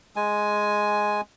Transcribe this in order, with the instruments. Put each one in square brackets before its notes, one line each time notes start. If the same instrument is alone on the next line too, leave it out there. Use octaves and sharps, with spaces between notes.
[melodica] G#3 G#5